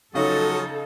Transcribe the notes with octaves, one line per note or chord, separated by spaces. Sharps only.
C#3 F3 F#3 C#4 D#4 A4 D#5